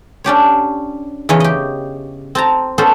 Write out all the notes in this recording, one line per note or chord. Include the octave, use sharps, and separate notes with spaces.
C#4 D4 G4 C#5
E2 C#3 E3 C#5 D#5
G4 D#5
C4 A5 A#5
B3 C#4 A4 C5